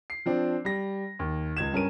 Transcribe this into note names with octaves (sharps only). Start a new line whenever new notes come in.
C7
F3 C4 D4
G3 A#6
D#2
C#2 G#6 E7
G2 C#4 A#4 D#7